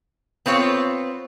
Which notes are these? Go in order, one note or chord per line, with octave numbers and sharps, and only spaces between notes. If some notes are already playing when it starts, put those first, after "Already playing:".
B3 C4 F4 C#5